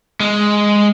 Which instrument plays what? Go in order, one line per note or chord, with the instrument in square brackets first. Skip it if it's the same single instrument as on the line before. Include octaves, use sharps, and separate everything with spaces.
[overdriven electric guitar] G#3